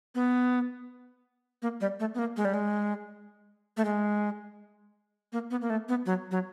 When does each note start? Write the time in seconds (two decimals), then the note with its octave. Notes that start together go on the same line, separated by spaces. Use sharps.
0.15 B3
1.62 A#3
1.81 G3
2.00 A3
2.14 B3
2.19 A#3
2.37 G#3
2.45 G3
2.54 G#3
3.77 A3
3.85 G#3
5.33 A#3
5.51 B3
5.61 A#3
5.70 A3
5.89 B3
6.06 F#3
6.31 F#3